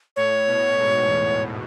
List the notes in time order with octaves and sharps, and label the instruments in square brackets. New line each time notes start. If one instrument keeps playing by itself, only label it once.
[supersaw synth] A2 [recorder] C#5
[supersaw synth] B2
G#2
E2